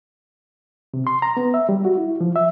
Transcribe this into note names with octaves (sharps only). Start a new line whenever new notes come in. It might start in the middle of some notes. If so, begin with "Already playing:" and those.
C3
C6
A#5
B3
E5
G3
F#4
E4
F3
E5